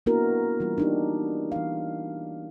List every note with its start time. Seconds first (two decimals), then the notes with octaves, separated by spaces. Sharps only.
0.06 A#3 B3 D4 E4 F#4 A#4
0.60 E3 G3 F4
0.78 D4 D#4 G4
1.52 E3 F5